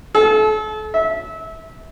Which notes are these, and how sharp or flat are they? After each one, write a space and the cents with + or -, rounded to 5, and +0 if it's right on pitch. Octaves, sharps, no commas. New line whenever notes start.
A4 -35
E5 -25